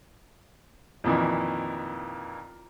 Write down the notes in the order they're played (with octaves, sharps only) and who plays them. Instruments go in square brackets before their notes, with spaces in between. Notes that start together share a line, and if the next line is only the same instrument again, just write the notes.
[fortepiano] F2 A#2 D#3 E3